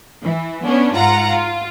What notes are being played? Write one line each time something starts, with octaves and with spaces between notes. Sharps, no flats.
E3
B3 C#4 D4
G#2 F4 F#5 A#5
F4